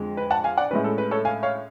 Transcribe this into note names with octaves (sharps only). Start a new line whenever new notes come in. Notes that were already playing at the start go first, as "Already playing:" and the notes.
Already playing: F2 D3 G#3
B4
F#5 A5
F5 G#5
D5 F#5
A2 G#3 C#4 B4
A4
B4
A4 C#5
F5 G#5
C#5 F5